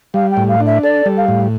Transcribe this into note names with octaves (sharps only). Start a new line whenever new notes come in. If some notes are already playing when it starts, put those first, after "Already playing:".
G3 F5
G5
A2
F5
D4
E5
A4 D5
G3
F5
A2